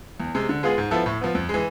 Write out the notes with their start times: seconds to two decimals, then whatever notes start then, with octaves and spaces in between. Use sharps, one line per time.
0.20 E2
0.35 C3 G#3
0.49 D3
0.63 G#3 B3 F4 G#4
0.78 G#2
0.91 F3 B3 E4 A4
1.06 A2
1.21 F3 B3
1.35 F2
1.49 G#3
1.54 E3